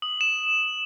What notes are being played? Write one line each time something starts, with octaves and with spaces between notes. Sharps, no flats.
D#6 F#7
E7